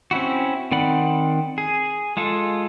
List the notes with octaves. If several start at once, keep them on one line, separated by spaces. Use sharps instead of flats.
C4 C#4 E4 F#4
D#3 C4 D5 F#5 B5
G#4
G#3 F4 A4